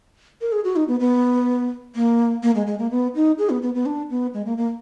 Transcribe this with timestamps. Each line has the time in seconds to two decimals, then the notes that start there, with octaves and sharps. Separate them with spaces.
0.41 A#4
0.52 G#4
0.64 F#4
0.76 D#4
0.88 B3
1.00 B3
1.96 A#3
2.43 A#3
2.55 G#3
2.67 G#3
2.79 A#3
2.91 B3
3.15 D#4
3.38 G#4
3.50 B3
3.62 B3
3.75 B3
3.86 D4
4.10 B3
4.34 G#3
4.46 A#3
4.58 A#3